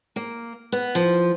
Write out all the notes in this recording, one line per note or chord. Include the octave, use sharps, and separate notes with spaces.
A#3
B3
F3